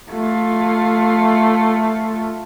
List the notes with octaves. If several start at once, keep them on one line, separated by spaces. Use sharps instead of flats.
A3 F4